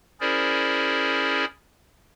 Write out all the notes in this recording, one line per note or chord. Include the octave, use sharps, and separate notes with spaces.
C#4 E4 G#4 A#4 C5 D5